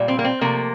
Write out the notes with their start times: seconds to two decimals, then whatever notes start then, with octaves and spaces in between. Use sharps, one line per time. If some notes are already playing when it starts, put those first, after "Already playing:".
Already playing: A#2 G3
0.08 C4
0.19 A#3
0.24 C4
0.41 C3 F3 A3 A#3